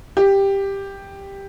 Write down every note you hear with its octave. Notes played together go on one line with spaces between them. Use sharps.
G4